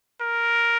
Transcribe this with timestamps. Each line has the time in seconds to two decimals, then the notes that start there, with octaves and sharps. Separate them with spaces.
0.21 A#4